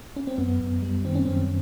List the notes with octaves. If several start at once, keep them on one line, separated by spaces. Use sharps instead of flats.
C#4
C4
F#2 B3
F#2
G3
D#3 C4
C#4
F#2 C4